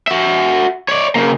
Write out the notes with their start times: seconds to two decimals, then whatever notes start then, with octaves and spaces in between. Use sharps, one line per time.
0.08 F#4 E5
0.88 C#5 D5
1.15 C#3 A#3